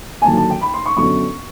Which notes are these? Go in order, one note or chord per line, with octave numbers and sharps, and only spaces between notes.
G#5
D#2 D3 F#3 A#3 A5
A5
G5
B5
C6
C#6
F#2 D3 F#3 B3 C#6